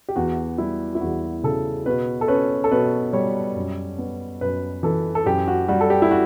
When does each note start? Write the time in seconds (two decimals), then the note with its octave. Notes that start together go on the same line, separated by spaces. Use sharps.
0.09 G4
0.16 E2 F#4
0.58 G3 E4
0.95 E4
1.01 E2 F#4
1.43 C#3 A4
1.86 B2 B4
2.21 A4
2.28 C#4 B4
2.64 A4
2.71 B2 B4
3.13 G3 C#5
3.55 F#2
3.98 B3
4.41 F#2 B4
4.83 E3 A4
5.15 A4
5.26 F#2 G4
5.47 F#4
5.68 G3 F#4
5.81 A4
5.90 G4
6.02 E4
6.11 F#4